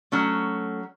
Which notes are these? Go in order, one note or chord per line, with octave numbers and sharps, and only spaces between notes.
F#3 A3 C#4